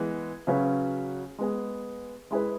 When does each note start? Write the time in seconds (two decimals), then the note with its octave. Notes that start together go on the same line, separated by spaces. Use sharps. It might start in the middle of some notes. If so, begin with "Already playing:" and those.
Already playing: E3 G#3 B3
0.47 C#3 F#3 C#4 F#4 B4
1.38 G#3 B3 G#4
2.31 G#3 E4 G#4 B4